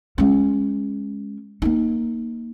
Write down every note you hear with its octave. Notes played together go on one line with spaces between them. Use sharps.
G#3 C#4
A#3 D#4